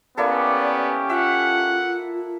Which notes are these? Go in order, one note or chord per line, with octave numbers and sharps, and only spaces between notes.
A#3 B3 C#4 E4 G4 A4 D5
F4 E5 F#5